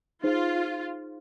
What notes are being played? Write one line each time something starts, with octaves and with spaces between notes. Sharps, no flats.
D#4 F4 G#4 C5